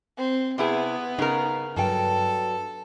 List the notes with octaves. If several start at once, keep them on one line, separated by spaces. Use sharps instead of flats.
C4
C3 B3 E4 G#4
C#3 D#4 A#4
G2 F#3 A4 G5